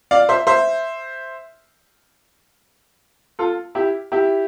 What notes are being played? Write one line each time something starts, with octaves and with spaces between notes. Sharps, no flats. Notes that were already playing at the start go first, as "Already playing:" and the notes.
D5 F5
C5 E5
C5 E5
F4 A4
E4 G4
E4 G4